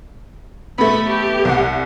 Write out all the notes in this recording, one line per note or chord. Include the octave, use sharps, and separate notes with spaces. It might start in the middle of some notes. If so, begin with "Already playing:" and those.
A3 B3 B5
G4
C2 F#5